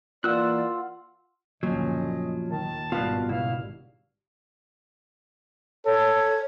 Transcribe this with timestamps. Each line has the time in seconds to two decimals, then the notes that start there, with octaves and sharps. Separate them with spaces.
0.24 E3 A#3 F4 D5 F#5 E6 F#6
1.63 F#1 D2 A#2 F3 F#3 C#4 D#5
2.49 D#2 D#3 A5
2.92 G#1 G2 B2 G3 B3 F4 F5
3.29 C#2 B2 E4 F5
5.86 A4 C#5